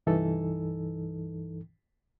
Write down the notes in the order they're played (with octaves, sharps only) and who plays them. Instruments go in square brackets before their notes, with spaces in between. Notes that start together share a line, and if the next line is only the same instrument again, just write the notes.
[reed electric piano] C2 G2 E3 D#4 A4